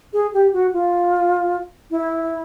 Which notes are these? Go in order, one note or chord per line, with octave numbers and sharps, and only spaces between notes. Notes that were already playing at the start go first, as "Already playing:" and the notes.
G#4
G4
F#4
F4
E4